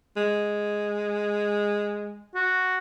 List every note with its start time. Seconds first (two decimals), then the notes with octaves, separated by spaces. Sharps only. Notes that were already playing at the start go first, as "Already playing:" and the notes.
0.17 G#3
2.35 F#4